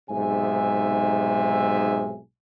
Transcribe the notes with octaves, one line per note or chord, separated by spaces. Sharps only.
B1 G#2 C3 G#4 E5 G#5